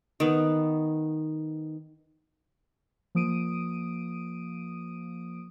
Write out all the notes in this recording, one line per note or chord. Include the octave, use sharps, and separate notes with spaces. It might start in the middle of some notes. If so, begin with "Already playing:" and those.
D#3 B3
F3 A#3 D#6 D7 D#7